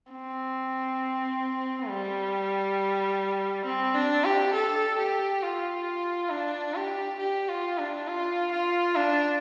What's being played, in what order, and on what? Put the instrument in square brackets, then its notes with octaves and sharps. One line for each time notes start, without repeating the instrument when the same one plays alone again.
[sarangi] C4
G3
C4
D4
G4
A4
G4
F4
D4
G4
G4
F4
D4
F4
F4
D4